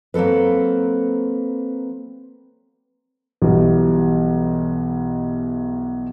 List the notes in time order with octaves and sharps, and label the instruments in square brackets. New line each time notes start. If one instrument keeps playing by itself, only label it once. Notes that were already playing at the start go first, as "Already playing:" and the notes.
[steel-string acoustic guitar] F#3 A#3 C4 A4 B4
[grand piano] B1 B2 E3 G3